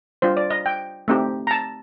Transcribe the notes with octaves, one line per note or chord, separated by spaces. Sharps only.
G3 D4 F4 C5
D5
D#5
G5
A3 C4 D#4 G4
A#5
A5